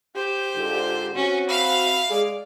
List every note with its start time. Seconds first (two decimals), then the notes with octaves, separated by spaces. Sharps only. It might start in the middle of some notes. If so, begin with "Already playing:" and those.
0.16 G4 C5
0.56 G#2 D3 F4
1.15 C4 C#4 F#4
1.49 E5 F5 B5 F6
2.10 G#3 G#4 D5